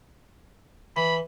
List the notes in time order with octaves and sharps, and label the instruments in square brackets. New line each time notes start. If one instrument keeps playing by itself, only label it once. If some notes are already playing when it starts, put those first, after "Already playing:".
[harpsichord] E3 [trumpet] B5